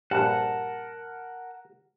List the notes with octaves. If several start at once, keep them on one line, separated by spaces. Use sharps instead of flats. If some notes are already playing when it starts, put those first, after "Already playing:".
A#1 G2 A#4 F#5 A5